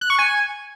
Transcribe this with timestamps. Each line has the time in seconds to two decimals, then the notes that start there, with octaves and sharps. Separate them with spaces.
0.01 F#6
0.10 C#6
0.19 G#5